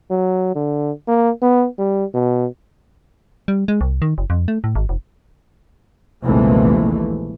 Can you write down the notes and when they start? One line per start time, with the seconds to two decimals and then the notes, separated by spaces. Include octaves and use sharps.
0.11 F#3
0.55 D3
1.08 A#3
1.42 B3
1.78 G3
2.14 B2
3.48 G3
3.68 G#3
3.81 C2
4.02 D#3
4.18 F#1
4.30 F2
4.48 A3
4.64 A2
4.75 G#1
4.89 F1
6.24 A#1 D#2 C3 E3 G#3 A3